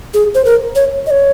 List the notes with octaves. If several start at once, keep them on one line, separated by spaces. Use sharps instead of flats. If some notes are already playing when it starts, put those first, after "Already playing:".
G#4
C5
A#4
C#5
D#5
C#5